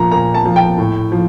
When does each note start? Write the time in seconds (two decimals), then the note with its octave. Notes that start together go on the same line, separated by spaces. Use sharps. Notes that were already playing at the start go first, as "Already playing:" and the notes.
Already playing: A#2 F3 A#5
0.12 A#2 A#5
0.34 A5
0.45 F3
0.56 G5
0.78 A2
1.12 F3